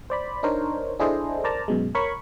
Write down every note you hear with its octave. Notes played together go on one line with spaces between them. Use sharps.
C5 D5 B5
D4 D#4 A#4 C5 C#5
D4 E4 G#4 A4 C5 D#5
A#4 C5 D5 A5 A#5
F#2 B2 G#3
A#4 C#5 B5 C#6